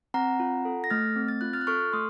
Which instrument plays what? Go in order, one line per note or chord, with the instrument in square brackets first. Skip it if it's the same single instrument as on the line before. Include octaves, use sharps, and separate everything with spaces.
[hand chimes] C4 F#5 A#5
F4
A4
A#6
A3 F6 A6
C4
A6
F4 F#6
F6 A6
F#6
A4 C#6 F6
A3 C6 D#6